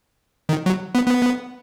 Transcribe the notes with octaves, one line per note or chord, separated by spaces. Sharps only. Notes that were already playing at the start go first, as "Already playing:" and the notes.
D#3
F#3
B3
B3